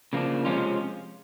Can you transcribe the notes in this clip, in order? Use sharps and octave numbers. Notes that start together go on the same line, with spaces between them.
C#3 F3 A#3 D4
C3 F3 G#3 C#4 F4